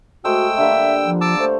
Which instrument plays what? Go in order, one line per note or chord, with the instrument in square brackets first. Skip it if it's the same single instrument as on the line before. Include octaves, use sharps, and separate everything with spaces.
[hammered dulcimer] G#3 A3 C5 [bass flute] F#4 [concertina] G5 E6
[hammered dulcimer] D3 G3 A#3 [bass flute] E5
[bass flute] F3
[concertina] A5 D6 E6
[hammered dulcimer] A3 [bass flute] C5